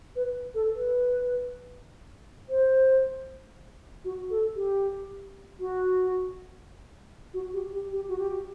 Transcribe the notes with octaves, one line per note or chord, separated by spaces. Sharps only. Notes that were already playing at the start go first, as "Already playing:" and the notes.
B4
A4
B4
C5
F#4
A4
G4
F#4
F#4
G4
G4
G4
F#4
G4